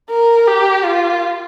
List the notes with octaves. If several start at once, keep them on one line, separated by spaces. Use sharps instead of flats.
A#4
G4
F4